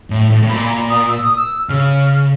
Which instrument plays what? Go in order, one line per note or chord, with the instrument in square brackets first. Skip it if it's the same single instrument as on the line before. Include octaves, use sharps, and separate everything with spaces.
[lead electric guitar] A2
A2
A2
[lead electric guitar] A#2 [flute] B5
[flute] A#5
D#6
E6
D#6
E6
[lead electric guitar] C#3 [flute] F6